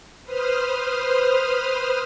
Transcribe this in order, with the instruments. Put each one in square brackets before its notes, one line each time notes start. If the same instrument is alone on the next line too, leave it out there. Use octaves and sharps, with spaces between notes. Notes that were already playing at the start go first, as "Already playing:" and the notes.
[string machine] B4 C5 D#6 F6